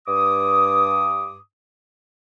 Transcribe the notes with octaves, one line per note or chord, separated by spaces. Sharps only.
G2 D6 D#6